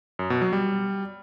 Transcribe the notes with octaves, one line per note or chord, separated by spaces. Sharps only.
F#2
B2
F#3
G3